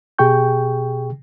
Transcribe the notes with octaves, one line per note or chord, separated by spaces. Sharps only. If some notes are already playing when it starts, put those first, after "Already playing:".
B2 G4 G#4 G5 C#6 G6